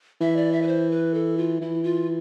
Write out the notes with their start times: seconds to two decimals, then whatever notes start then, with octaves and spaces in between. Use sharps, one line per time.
0.21 E3 E5
0.36 D5
0.52 E5
0.62 B4
0.67 C5
0.91 B4
1.14 A4
1.38 F4
1.61 E3 E4
1.84 F4